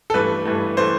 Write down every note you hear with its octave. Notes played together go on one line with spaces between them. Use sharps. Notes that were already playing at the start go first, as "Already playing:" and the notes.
A4
G2 E3 A3 B4
G2 E3 A3
E3 A3 C5